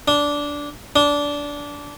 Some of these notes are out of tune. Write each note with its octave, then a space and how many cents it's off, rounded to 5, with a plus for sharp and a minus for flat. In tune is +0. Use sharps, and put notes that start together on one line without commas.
D4 -15
D4 -20